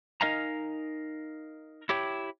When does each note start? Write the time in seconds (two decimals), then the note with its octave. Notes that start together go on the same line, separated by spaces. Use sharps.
0.21 D#4 A#4 D#5 F5 G#5 A#5
1.89 E4 G4 C#5 G5